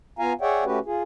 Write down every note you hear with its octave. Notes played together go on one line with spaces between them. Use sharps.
B3 F4 F5 G#5 A#5
G#4 C#5 D5 E5 F#5 G5
A3 C#4 F#4 G4 B4
F4 G#4